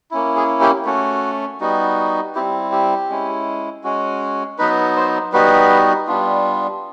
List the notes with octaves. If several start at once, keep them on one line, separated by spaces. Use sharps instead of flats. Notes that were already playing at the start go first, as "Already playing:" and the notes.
A#3 C#4 E4
G#4
G4
A3 C#4 F#4
G3 B3 D#4 F#4
G3 C4 E4 G4
G4
G#3 C#4 E4
G#3 C#4 F#4
F#3 B3 D#4 B4
C5
G3 B3 D#4 F#4 B4
G3 B3 D4 F4